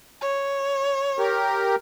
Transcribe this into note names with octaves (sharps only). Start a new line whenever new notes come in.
C#5
G4 A#4